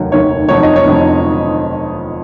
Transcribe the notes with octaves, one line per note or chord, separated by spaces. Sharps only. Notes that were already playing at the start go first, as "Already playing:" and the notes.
Already playing: F1 D#2 D#3 F#3
F1 D#2 D#3 F#3 C#5
F1 F2 D#3 F#3 C#5
D#5
C#5
F1 F2 D#3 F#3